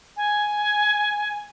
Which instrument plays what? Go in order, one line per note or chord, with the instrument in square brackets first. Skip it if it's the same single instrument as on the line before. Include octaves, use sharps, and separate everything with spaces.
[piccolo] G#5